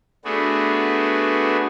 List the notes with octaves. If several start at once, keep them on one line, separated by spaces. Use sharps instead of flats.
A3 B3 D4 F#4 G#4